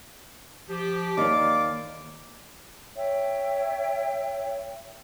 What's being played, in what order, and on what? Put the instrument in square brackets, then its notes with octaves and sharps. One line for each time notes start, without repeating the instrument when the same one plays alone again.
[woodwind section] F3 G4
[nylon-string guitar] D#2 D#4 C#5 [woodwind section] D5 F5 D6
[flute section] C#5 E5 G5